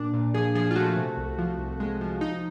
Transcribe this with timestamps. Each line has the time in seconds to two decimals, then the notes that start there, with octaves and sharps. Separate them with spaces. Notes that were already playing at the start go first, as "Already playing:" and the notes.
Already playing: A#2 D4
0.14 A#2
0.34 F3 G#4
0.55 F3 G#4
0.71 F4
0.75 A3 F#4
0.96 C3
1.17 C2
1.38 F3
1.58 C2
1.80 G#3
2.01 F3
2.21 D#4